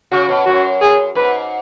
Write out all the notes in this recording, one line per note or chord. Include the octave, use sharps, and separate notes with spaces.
C#3 F#4
B2
F#2 F#4
G#4
G#2 B4